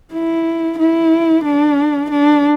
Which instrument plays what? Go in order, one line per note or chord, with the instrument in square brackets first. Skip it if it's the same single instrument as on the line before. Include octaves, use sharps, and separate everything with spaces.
[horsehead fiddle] E4
E4
D4
D4